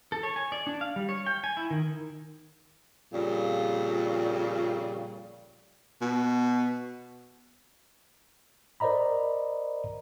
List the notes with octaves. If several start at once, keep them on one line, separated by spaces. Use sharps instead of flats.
A4
C#5
G#5
D5
D4
F5
G3
C#5
G5
G#5
E4
D#3
F2 A#2 C#3 G3
B2
A#4 C5 D5 D#5 A#5 B5